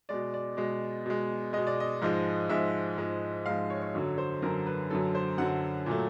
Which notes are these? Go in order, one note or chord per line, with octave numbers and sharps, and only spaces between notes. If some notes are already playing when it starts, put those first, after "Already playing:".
B2 G#3 D5
D5
B2 G#3
B2 G#3
B2 G#3 D#5
D5
D#5
G#2 F3 G#3
G#2 F3 G#3 E5
G#2 F3 G#3
G#2 F3 G#3 F5
C#5
C#5
F#2 D3 F#3 C#5
C5
F#2 D3 F#3 A#4
B4
F#2 D3 F#3 A4
C5
F#2 D3 F#3 F#5
A#2 F#3 A3